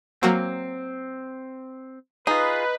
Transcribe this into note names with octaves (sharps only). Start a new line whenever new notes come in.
F#3 A#3 C4 F#4
D#4 F4 G#4 B4